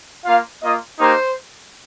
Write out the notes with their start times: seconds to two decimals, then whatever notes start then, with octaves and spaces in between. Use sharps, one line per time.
0.24 A#3 F4 F5
0.61 A#3 F4 D#5
0.99 A#3 D#4 G4 C5